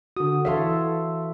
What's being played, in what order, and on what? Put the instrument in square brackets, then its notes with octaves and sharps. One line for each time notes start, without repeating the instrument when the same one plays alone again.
[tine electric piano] D3 D#6 [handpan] F#4
[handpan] E3 A4 C#5 [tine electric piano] E5 F5 C6